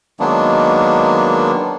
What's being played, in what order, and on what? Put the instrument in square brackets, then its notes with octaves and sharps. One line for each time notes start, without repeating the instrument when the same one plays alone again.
[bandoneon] D#3 F#3 G#3 A#3 B3 D4